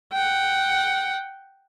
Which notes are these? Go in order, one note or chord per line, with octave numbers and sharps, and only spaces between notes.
F#5 G5